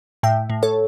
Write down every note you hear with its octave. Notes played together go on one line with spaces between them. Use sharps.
A2 E5 G5
A2
A4 C#5